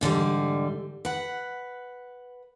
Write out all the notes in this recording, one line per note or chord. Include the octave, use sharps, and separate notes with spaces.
G#2 D3 E3 G3
B4 F#5